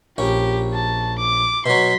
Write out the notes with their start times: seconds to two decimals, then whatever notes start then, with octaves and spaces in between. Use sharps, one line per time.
0.18 A#1 C#4 G4
0.74 A5
1.19 D6
1.66 B2 F#3 C6 B6